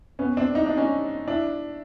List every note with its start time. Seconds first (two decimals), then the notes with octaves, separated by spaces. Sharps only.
0.19 B3 C#4
0.37 C4 D4
0.55 D#4
0.66 D4
0.77 C#4 D#4
1.28 D4 E4